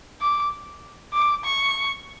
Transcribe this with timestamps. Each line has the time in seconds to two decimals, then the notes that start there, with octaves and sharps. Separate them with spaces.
0.21 D6
1.13 D6
1.44 C#6